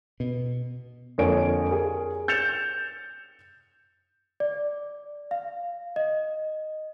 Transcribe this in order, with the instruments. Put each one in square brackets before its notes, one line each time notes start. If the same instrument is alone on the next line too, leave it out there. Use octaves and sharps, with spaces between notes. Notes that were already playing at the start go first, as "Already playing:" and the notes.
[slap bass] B2
[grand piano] F2 D3 A#3 C#5 G#5 D7
G#4 A#4
G6 A6 C#7 E7 F7
[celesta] D5
F5
D#5